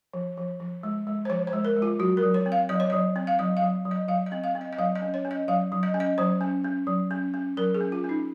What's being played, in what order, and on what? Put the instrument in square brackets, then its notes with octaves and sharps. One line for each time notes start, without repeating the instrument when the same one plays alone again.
[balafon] F3
F3
F3
G#3
G#3
C5
F3 C#5
C5
G#3
A#4
G#3
F4
F#3 F#4
A#4
F#3
C#5
C4
F5
F#3 D#5
C#5
F#3 D#5
C4
F5
F#3 D#5
F5
F#3
F#3
D#5
F#3 F5
D#5
C4
F5
C4
D#5
D#5
F#3 F5
D#5
C#4
C#5
C#4
D#5
F#3 F5
F#3
D#5
C#4
D#5
F#3 C5
C#4
C#4
F#3
C#4
C#4
F#3 A#4
G#4
C#4
F4
C#4 D#4